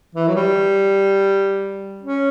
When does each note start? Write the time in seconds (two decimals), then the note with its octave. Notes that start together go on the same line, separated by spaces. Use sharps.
0.15 E3
0.28 F#3
0.35 G3
2.02 C#4